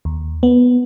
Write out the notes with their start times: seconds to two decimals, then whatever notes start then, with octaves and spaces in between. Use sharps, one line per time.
0.05 D#2
0.43 B3